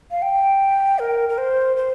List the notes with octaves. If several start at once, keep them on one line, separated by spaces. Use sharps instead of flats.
F5
G5
A#4
A#4
C5
C5